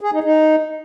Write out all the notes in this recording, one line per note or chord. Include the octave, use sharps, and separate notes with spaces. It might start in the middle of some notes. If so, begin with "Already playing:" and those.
G#4
D#4
D#4